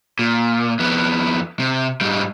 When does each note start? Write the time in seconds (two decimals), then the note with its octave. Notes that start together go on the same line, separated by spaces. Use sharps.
0.19 A#2
0.79 F2 B3
1.60 C3
2.01 G#2 G3